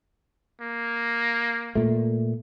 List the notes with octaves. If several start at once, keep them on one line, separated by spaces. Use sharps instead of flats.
A#3
A#2 A3